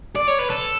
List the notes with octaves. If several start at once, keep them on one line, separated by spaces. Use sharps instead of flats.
D5
C#5
B4
A4